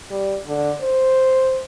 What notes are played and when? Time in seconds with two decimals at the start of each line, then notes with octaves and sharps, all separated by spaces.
0.11 G3
0.47 D3
0.81 C5